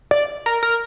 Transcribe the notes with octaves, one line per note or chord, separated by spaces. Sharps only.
D5
A#4
A#4